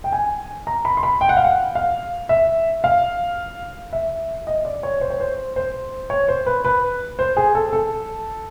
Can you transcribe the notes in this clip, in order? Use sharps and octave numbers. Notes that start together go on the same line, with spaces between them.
G5
G#5
A#5
B5
C6
B5
G5
F#5
F5
F#5
F5
E5
F5
E5
D#5
D5
C#5
C5
C#5
C5
C5
C#5
C5
B4
B4
C5
G#4
A4
A4